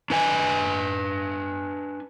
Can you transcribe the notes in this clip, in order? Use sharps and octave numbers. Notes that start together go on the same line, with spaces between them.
D4 B4 G#5